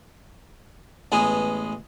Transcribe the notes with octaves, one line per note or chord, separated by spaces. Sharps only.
A1 G#3 B3 G#4